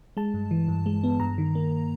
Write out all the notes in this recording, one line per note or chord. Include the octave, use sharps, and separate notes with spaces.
G#3 A5
G2
E3
G2
G#3
B3
G2 A#5
D#3
A#3